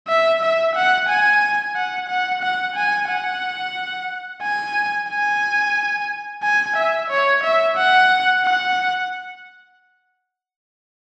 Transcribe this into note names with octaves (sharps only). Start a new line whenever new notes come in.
E5
E5
F#5
G#5
F#5
F#5
F#5
G#5
F#5
G#5
G#5
G#5
E5
C#5
E5
F#5
F#5